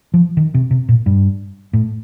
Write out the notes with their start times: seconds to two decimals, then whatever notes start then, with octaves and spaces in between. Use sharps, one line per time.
0.14 F3
0.37 D#3
0.54 C3
0.71 C3
0.89 A#2
1.06 G2
1.73 A2